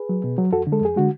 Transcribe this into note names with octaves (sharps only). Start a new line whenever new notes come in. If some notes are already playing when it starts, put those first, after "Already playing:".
Already playing: G#4 B4
F#3
B2
F#3
F2 F#4 A4
D3
G#3 A4
F2 G#4
D3 G#3 F#4